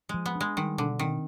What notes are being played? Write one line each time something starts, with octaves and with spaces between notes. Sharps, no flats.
F3 G#3
B3
D4
G#3
D#3 G3
B2 D3
D#3 C4